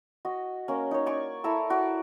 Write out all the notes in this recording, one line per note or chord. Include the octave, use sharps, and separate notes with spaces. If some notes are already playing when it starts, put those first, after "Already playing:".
F#4 D#5
A#3 C#4
D#4 C#5
D5 G#5 C#6
E4 A4 A#5 E6
F#4 D5